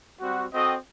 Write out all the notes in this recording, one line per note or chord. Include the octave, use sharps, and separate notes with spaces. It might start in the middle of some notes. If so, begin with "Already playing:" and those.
G3 C4 F#4
C4 F#4 A4 D#5 G5